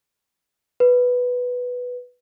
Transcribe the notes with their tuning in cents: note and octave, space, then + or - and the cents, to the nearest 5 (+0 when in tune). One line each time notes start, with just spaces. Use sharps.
B4 +0